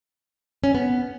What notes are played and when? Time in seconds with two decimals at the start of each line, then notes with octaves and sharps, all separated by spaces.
0.64 C#4
0.75 B3